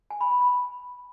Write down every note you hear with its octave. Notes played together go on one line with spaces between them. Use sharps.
G#5
B5
B5
B5